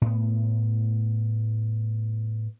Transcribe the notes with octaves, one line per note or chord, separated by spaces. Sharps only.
A2 B3